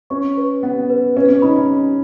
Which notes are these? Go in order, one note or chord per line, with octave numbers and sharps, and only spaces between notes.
C#4 C#6
B4
B3 F#5
B4
C#4 B4
C#4
D#4 B5
C#4
B5